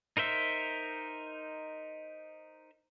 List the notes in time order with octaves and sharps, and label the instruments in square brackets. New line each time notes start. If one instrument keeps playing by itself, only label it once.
[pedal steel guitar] D#4 A#4 C5 E5